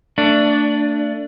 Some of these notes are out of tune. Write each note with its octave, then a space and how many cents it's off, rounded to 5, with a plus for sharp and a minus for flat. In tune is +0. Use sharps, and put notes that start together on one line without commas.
A3 +35 D4 +0